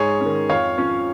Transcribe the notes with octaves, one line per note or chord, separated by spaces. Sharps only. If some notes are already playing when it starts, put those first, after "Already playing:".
Already playing: G#2 G#4 C#5
D#3 C#4
F2 C#5 F5
F3 C#4